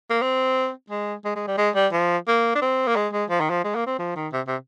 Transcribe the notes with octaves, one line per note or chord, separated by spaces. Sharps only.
A#3
C4
G#3
G#3
G#3
G3
G#3
G3
F3
A#3
D4
C4
A#3
G#3
G#3
F3
D#3
F3
G#3
A#3
C4
F3
D#3
C3
C3